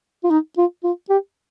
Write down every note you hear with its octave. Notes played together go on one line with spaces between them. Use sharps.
F4
D#4
F4
F4
G4